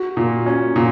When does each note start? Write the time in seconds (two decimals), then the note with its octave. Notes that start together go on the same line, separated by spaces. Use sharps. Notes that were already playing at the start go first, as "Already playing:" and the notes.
Already playing: F#4
0.17 A#2
0.46 C#4
0.76 A#2 F#4